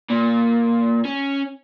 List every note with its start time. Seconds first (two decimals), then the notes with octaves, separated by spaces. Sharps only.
0.10 A#2
1.05 C#4